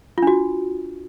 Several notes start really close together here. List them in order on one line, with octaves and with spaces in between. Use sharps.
F4 D4 F#4